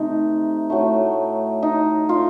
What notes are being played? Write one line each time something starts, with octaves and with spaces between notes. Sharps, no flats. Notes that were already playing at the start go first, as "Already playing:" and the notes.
Already playing: C3 A3 D#4
A2 F#3 A3
D#4
F4